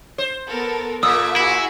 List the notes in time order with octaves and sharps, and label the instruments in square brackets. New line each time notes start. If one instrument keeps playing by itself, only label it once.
[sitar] C5
[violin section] B3 A4 A#4
[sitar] A#2 A#3 [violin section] A4 E5 [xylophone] D#6 E6
[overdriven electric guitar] E4 [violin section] F#4 G#4 [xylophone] E7